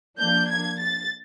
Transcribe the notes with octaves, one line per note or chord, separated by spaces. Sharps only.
F3 A#3 D4 G6
G#6
A6